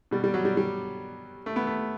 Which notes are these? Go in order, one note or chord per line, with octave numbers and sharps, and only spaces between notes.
B2 G3
G3
F#3
G3
G3
A3
B3
A3